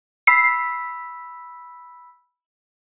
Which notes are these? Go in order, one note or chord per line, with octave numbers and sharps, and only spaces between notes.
B5 E6 B6 C7